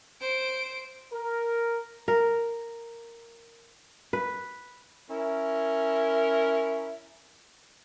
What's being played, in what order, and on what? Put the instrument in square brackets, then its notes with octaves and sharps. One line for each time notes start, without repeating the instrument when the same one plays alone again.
[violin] C5 D7
[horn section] A#4
[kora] A#4
B4
[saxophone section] C#4 E4 A#4